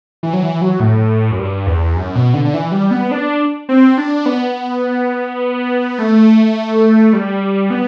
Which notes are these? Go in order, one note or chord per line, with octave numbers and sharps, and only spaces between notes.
E3
F#3
E3
F#3
A2
F#2
G2
E2
F#2
B2
D3
D3
E3
G3
B3
D4
C4
D4
B3
A3
G3
B3